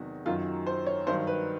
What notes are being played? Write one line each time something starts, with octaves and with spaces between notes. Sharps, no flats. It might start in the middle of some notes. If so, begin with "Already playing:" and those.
Already playing: E2 C3 D#3 F#3 F#4
F#2 D#3 F#3 F4
C5
C#5
G2 D#3 F#3 C5
B4